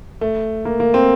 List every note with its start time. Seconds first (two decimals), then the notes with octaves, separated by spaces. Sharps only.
0.21 A3
0.65 A#3
0.80 A#3
0.94 C4